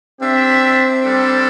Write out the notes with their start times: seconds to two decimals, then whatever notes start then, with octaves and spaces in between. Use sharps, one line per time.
0.21 C4 D4 G4 E5
1.04 G3 D4 A4